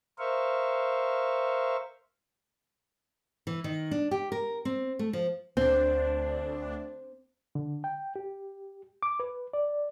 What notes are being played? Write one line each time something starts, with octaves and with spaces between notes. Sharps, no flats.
A#4 C5 E5 F5 C#6
E3
D#3
D4
G4
A#4
C4
A3
F3
D2 C4 D4
D3
G5
G4
D6
B4
D5